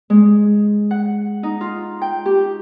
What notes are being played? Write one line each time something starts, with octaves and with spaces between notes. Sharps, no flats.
G#3
F#5
D#4
F4
G5
G4